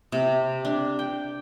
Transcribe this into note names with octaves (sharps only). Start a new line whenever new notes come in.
C3
D4
G5